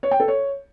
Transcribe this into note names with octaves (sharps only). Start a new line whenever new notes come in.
C#5
G5
A4
C#5